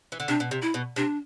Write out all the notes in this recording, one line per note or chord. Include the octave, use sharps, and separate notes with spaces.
E3
D3
C3 D4
B2
C3
E4
B2
C3 D4